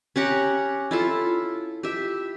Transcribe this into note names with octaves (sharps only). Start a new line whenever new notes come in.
C#4 G4 F#5 A#5
E4 F4 A4
G4 E5